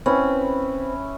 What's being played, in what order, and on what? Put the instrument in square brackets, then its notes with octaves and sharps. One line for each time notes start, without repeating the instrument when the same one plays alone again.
[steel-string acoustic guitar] C4 [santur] C#4 E4 B4